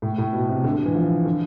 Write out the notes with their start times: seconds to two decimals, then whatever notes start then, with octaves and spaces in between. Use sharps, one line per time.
0.02 A2
0.18 A2
0.33 B2
0.49 C3
0.64 D3
0.75 D3
0.85 E3
0.95 F3
1.25 D3